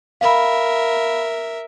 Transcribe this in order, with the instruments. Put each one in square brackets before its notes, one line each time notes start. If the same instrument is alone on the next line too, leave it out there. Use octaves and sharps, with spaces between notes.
[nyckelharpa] A#4 E5 [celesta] F5 B5